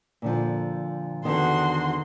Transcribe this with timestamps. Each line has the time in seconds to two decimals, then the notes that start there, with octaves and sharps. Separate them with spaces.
0.22 A#2 D3 F3
1.25 E2 D3 D#3 F#4 C6